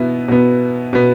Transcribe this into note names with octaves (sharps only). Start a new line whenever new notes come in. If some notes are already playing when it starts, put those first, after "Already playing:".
Already playing: B2 B3 E4
B2 B3
B2 B3